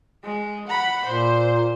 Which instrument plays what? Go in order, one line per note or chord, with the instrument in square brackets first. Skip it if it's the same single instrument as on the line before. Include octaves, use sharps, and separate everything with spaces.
[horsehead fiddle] G#3
F#5 B5
[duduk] A#2 [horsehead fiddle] C5